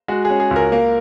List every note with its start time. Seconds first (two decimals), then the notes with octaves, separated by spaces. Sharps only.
0.08 G#3 F#4
0.25 G#4
0.30 C#4
0.40 G#4
0.51 C#2
0.56 A#4
0.72 A#3